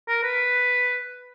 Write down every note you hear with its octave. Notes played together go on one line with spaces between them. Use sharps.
A#4
B4